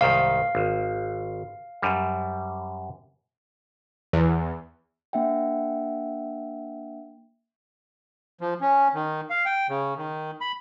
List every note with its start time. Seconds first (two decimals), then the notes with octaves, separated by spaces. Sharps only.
0.01 C2 G#2 D#3 F5
0.55 G#1
1.82 F#2 G3
4.13 E2
5.13 A#3 D4 E5 F#5 G5
8.41 F3
8.61 C#4
8.95 D#3
9.30 F5
9.45 G5
9.69 C#3
9.97 D#3
10.41 B5